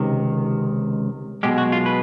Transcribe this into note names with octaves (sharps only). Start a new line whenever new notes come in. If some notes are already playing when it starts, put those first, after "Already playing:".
Already playing: C#2 C3 D#3
B1 B2 G#3 G4
F#4
F4
B4